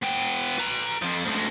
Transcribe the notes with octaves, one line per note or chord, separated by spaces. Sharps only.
B3 G5
B4 A#5
F2 F3
D2 G#3